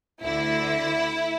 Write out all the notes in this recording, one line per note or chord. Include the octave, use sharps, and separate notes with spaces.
D2 D3 E4